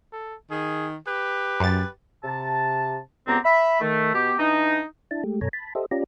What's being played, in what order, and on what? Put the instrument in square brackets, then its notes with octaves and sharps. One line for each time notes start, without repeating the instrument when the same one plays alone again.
[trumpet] A4
[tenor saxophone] D#3 [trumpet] G#4
[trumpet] G4 [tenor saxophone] B4
[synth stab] F#2 A6
[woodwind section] C3 A5
C#2 B3 C4 G4 A#5
E5 B5
D#3 A3
B2 B3 G4
E3 D4 D#4
[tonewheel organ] D4 E4 A5
G#3 A3 G4
F#2 B2 A4 C#5 G#5 A#5
A5 B5
G4 A4 C5 D#5 E5
C#4 F4 G4 D5 A#5